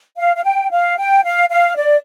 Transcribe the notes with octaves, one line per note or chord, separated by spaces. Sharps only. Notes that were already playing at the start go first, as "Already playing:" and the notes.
F5
F5
G5
F5
G5
F5
F5
D5